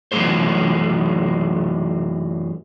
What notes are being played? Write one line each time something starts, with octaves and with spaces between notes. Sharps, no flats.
F#2 E3 F#3 A3 G#4 C5